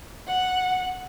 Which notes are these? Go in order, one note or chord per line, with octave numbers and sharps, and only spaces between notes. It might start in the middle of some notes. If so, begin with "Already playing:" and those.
F#5